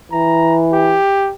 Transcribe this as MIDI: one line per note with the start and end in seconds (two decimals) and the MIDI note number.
0.12 0.98 52
0.12 0.59 82
0.73 1.32 67